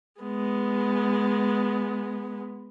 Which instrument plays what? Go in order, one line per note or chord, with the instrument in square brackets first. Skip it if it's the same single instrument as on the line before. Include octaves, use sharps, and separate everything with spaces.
[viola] G#3 B3